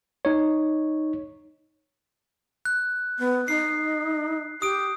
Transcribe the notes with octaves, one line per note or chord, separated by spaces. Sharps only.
D#4 C#5
F#6
B3
D#4 C7
G4 D#6 D7